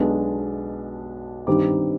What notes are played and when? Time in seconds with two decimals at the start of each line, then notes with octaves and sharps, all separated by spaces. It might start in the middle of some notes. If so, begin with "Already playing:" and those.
Already playing: B1 B2 G#3 B3 D4
1.47 G2 D#3 G3 C4 D#4 D6